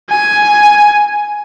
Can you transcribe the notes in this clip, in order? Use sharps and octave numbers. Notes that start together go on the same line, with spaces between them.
G#5